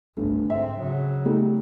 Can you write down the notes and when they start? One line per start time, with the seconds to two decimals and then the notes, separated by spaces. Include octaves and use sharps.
0.17 G1 C2 G2 A3
0.50 G#2 C4 E5
0.80 C#3 F#3
1.25 G3 A3 D#4